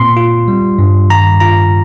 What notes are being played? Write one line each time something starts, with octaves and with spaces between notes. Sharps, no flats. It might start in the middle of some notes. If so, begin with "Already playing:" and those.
Already playing: A#2 C4 C6
F4
G3
G2
D#3 A#5
F4 A#5